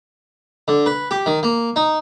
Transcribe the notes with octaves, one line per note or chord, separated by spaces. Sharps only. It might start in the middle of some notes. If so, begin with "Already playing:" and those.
D3
B4
G4
D#3
A#3
D#4